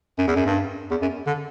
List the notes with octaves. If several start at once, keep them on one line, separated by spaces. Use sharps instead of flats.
F#2
E2
F#2
G2
E2
F#2
D3